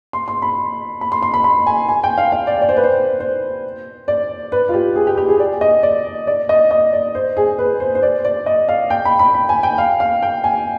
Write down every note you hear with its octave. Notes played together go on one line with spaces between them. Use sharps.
C6
C6
B5
B5
C6
C6
B5
B5
G#5
G#5
G5
F5
F5
D5
D5
C5
B4
C5
C5
D5
B4
F4
G4
G#4
G4
G4
G#4
D5
D#5
D5
D5
D#5
D#5
D5
C5
G#4
B4
C5
C5
D5
D5
D#5
F5
G5
B5
B5
B5
G#5
G5
F5
F5
G5
G#5